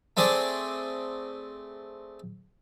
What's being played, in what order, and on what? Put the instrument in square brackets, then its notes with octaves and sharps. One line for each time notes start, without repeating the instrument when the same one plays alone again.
[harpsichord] A3 C4 G#4 D5